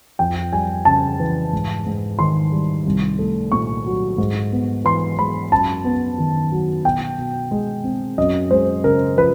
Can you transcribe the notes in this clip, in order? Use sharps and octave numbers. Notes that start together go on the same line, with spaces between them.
F2 G5
G3 G#5
C#3 A5
E3
G#2
G#2
D#3 C6
G3
C2
A3
A#2 C#6
F#3
G#2
B3
E3 C6
G#3 B5
F#2 A5
B3
D#3
F#3
B2 G5
B2
G#3
C4
F#2 D#5
G#3 C5
C#3 A#4
F3 B4